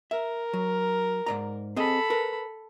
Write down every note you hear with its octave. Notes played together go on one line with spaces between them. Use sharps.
A#4 E5
F#3
G#2 D5 A#5
C4 G#4 A4 D#5 B5
A#4 B4